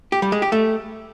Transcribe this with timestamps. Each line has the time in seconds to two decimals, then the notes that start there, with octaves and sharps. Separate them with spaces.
0.12 G4
0.22 G3
0.32 G#3
0.42 G4
0.52 A3